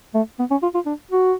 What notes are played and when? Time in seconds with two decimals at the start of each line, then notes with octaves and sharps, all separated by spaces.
0.14 A3
0.39 B3
0.51 C#4
0.63 F4
0.74 F4
0.86 D4
1.11 F#4